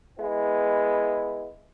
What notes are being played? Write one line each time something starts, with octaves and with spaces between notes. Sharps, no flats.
G#3 B3 E4